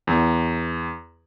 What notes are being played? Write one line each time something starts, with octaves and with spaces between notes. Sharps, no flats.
E2